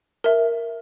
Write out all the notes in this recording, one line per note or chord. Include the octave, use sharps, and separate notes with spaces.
A#4 E5